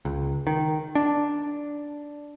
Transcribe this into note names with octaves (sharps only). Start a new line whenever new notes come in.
C#2
D#3
D4